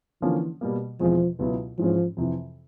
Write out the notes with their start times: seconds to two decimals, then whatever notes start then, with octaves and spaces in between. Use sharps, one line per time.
0.22 D3 E3 F3 A#3 C#4
0.61 B2 G3 A#3
1.00 E2 B2 F3 G#3 C4
1.39 C#2 B2 F#3 B3 E4
1.79 G#2 E3 F3 G#3 C#4
2.17 F2 C3 E3